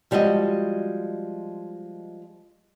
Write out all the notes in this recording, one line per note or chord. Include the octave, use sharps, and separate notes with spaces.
F3 G3 G#3 F#4 D#5